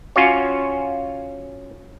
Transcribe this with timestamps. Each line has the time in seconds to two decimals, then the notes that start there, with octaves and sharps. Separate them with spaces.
0.16 C#4 F4 F#4 C#5